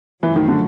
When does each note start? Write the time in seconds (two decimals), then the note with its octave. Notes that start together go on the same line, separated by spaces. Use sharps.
0.23 F#2 C#3 E3 F3 A3
0.36 D#3
0.48 D3